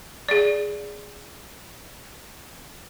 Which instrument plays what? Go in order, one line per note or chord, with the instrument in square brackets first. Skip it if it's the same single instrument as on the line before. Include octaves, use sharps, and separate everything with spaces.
[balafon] G#4 D5